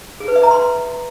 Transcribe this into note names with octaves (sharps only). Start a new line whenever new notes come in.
G#4
B4
E5
A#5
C6